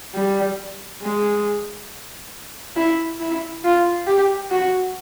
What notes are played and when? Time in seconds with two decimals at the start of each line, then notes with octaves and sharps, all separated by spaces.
0.15 G3
1.02 G#3
2.76 E4
3.20 E4
3.64 F4
4.07 G4
4.51 F#4